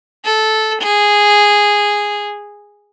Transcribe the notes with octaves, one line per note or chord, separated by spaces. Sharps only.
A4
G#4